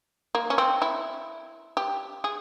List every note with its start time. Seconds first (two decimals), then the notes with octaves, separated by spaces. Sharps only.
0.35 A#3
0.50 C#4
0.58 C4
0.82 E4
1.77 G4
2.24 G#4